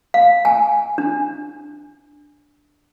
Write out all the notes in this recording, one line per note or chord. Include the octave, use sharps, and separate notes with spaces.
F5
G#5
D4